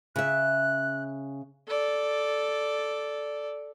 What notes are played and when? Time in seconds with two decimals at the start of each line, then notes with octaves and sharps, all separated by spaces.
0.16 C#3 E5 F#6
1.68 A4 D5